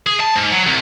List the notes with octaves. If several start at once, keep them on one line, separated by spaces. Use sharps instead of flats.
G#4
A5
G#2
F#3
C2